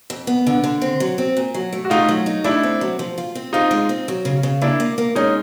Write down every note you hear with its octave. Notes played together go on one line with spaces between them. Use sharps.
F2
B3
D3
D3
C4
F#3
C4
A#2
F#3
A3
F#4
A3 D#4 F4
F#3
D#4
A3 D4 E4
C4
F#3
F3
F4
C4
C4 D#4 F4
G#3
C4
F#3
C#3
C#3
A#3 D4 E4
A#3
A#3
G#3 C#4 D#4